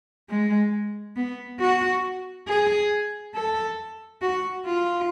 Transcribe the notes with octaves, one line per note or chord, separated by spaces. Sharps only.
G#3
B3
F#4
G#4
A4
F#4
F4